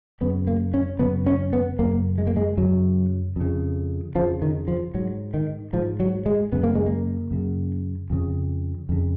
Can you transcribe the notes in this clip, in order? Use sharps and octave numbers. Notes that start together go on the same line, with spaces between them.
F#2 C#3 B3
A#3
C#4
F#2 C#3 B3
C#4
B3
F#2 C#3 A#3
G#3
A#3
G#3
F#2 C#3 F#3
F2 C#3
F2 C#3 F3
D#3
F3
G#2 F#3
D#3
G#2 F3
F#3
G#3
F#2 C#3 B3
A#3
G#3
A#3
F#2 C#3
F2 C#3
F2 C#3